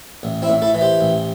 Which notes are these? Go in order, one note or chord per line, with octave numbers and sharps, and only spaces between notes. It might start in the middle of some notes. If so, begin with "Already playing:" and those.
A1
C4 E4
A2
E4 A4
E3
G4 C5
A1